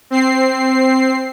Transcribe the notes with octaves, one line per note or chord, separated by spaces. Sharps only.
C4 C7